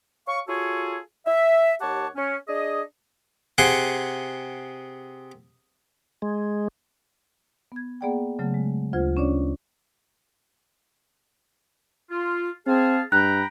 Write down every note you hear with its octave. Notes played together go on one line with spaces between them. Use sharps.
C#5 F5 C#6
F4 F#4 G#4 A4 C#5
E5
D#2 G4 C#5 F#5 A5
C#4
D4 G#4 D#5
C3 G#4 F#5 C6
G#3
B3 G#6
A#3 B3 G#4 D5 F#5 G5
C#3 F#3 A3
G#3
D2 F4 C5 G#6
C#4 D4 C#5 D5
F4
C4 G#4 F5 A5
G2 G5 A#5 B5 F#6